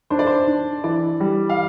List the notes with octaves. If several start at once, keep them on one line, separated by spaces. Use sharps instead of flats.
D4 C5
D5
C5
D4
E3 D5
G3
F5